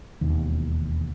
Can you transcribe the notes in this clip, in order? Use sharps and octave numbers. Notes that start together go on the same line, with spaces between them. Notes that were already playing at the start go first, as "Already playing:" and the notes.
E1 D#2